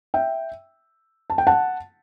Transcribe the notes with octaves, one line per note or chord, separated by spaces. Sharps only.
E5 G5
A5
G5
F#5 A5